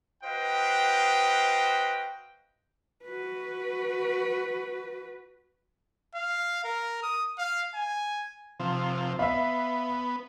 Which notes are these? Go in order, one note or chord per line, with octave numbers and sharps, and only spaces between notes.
F#4 B4 C5 D#5 F5 G5
F#4 B4
F5
A#4
D#6
F5
G#5
C3 F3
B3 E5 F5